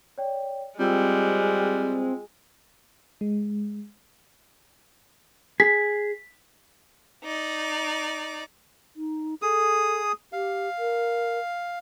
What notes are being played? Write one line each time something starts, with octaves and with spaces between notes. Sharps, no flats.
C#5 D5 G5
G3 G#3 C4 F4 G5 E6
G#3
G#4 B6
D#4 D5
D#4
G#4 A4 D#6
G4 F5
A#4